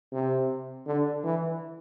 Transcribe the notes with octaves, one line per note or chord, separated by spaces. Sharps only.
C3
D3
E3